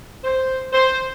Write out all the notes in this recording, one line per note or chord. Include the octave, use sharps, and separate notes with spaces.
C5
C5